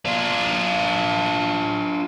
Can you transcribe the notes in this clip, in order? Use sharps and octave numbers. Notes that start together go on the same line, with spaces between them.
D4 F4